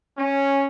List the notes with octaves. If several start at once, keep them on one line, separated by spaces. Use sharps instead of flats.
C#4